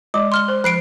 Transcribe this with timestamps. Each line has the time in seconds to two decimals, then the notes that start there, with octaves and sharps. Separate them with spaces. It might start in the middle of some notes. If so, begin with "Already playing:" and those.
0.14 G#3 D5 D6
0.32 C6 F6 G7
0.48 C5
0.64 F3 F#6 C7 D7